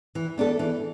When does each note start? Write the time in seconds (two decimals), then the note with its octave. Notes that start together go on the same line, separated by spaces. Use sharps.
0.15 E3
0.38 B3 D4 A4
0.59 E3